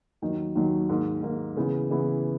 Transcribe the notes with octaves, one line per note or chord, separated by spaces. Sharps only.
D#2 D#3 F#3
D#2 D#3 F#3
G#2 D#3 A#3
G#2 D#3 A#3
C#3 E3 B3 E4
C#3 E3 B3 E4